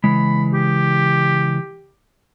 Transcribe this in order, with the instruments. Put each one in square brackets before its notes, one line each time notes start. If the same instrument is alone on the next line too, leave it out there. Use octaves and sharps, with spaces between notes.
[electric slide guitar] C#3 E3 G#3 [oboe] B5
[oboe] G4